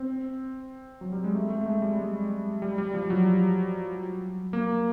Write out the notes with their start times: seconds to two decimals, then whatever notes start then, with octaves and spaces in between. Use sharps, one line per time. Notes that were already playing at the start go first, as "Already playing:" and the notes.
Already playing: C4
1.01 F#3
1.12 G3
1.24 G#3
1.35 A3
1.50 A3
1.61 A3
1.66 G#3
1.82 G3
1.99 G#3
2.62 G3
2.78 G3
2.94 F3
3.10 F#3
4.53 A#3